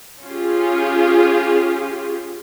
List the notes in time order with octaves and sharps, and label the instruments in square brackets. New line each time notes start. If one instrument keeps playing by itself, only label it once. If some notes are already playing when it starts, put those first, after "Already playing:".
[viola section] C#4 F4 G4 G#4